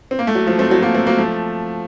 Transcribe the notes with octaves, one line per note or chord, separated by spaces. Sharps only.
C4
A#3
A3
F#3
F3 A3
A3 C4
F#3
F#3 A#3
A3 C4
F#3 A#3
F3 A3